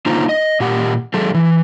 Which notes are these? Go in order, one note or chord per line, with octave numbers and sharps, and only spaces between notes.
D3 A#3 D#4 F4 C5 A#5
D#5
A#2 G4 F#5
F#3 G#4 A4
E3